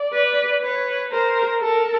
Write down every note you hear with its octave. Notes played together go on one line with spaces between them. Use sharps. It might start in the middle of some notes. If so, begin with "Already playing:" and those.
Already playing: D5
B4
B4 C#5
A#4 C5
A4 A#4